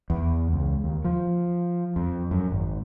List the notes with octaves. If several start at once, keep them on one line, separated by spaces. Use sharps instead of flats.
E2
C#2
D#2
F3
F2
F#2
G#1